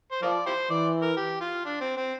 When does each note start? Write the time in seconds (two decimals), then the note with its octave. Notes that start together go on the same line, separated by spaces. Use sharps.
0.11 C5
0.22 F3 F4 A#4 D5
0.46 E4 G4 C5
0.70 E3 D5
1.02 A#4
1.17 G4
1.41 F4
1.65 D4
1.81 C4
1.97 C4